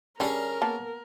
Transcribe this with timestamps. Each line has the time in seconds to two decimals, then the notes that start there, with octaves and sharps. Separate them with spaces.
0.20 D3 G3 C#4 D4 G#4 A#4
0.62 A#3 B3 A5